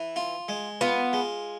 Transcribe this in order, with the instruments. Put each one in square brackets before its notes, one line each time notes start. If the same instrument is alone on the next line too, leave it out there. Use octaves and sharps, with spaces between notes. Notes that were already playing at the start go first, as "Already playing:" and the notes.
Already playing: [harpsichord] E3
F4
G#3
[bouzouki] B3 [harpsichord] F4
[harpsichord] G#3